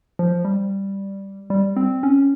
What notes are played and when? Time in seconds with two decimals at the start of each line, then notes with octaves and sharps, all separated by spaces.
0.19 F3
0.45 G3
1.50 G3
1.77 C4
2.03 C#4